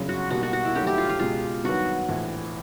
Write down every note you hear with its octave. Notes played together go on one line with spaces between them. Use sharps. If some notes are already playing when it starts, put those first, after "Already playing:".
Already playing: G1 F#2 C#3
F#4
B1 B2 G3 A#3 F#4
F#4
F#4
E4
G2 D#3 F#3 A3 G4
G4
F4
F4
C#2 B2 G#3 F4
G2 D#3 F#3 B3 F#4
A#1 A2 E3